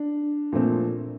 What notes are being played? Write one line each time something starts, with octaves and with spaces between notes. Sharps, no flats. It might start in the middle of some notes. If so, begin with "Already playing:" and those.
Already playing: D4
A#2 F3 A3 C4